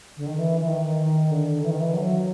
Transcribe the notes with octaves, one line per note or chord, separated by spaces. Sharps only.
D3
D#3
E3
E3
D#3
D#3
D3
E3
D#3
E3
F#3